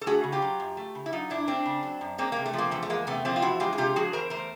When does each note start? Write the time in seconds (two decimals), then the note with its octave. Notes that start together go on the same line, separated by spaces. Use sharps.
0.01 A4
0.06 A3 F#4 G#4
0.23 C#3
0.32 F4 G4
0.42 F#3
0.60 F#2
0.77 A3
0.95 C#3
1.06 E4
1.12 F#3 D#4 F4
1.30 F#2 D4 E4
1.47 A3 C4 D4
1.66 C#3
1.83 F#3
2.01 F#2
2.18 G#3 A#3 C4
2.32 C3 A#3
2.46 A3
2.53 F3 A#3
2.71 E2 A3
2.83 A3
2.90 G#3 A#3
3.07 C3 A3 B3
3.25 F3 A#3 C4
3.36 F4
3.42 E2 E4 F#4
3.60 G#3 F4 G4
3.73 G#4
3.78 C3 F4 G4
3.96 F3 F#4 G#4
4.13 E2 A#4 C5
4.30 A3 A#4 C5